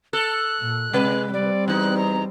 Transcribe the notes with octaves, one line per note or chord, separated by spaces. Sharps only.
A4 F#6
A#2
C3 G#3 B4
G3 C4 D5
E2 D#4 F#6
A#5